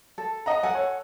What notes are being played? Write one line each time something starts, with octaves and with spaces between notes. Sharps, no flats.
A4
D#5 F#5 A#5
A4 F#5 G#5
C#5